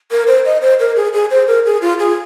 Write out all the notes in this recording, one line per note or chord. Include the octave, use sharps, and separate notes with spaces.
A#4
C5
D#5
C5
A#4
G#4
G#4
C5
A#4
G#4
F4
G#4